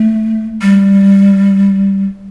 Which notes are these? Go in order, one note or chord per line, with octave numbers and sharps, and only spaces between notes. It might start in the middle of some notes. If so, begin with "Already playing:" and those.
Already playing: A3
G3